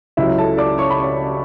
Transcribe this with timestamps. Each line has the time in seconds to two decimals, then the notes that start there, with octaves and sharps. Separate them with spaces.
0.17 C#2 C#3 F#3 E4 E5
0.38 A4 A5
0.58 D5 D6
0.78 C#5 C#6
0.90 B5
0.98 C#5 C#6